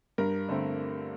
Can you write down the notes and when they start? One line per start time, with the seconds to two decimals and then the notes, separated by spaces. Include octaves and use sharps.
0.18 G2 A#4
0.49 D3 A3 C4